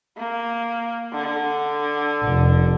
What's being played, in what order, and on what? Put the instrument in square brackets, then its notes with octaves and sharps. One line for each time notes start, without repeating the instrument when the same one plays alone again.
[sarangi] A#3
D3
[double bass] F1